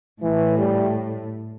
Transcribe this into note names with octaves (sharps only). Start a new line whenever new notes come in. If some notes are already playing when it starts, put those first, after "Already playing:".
A2 E3 A3
G3